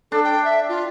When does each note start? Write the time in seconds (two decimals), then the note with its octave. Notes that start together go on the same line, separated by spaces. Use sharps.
0.12 D4 A4
0.24 G5
0.45 E5
0.69 F4